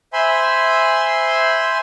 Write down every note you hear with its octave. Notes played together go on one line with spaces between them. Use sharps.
C5 E5 G#5 B5 C6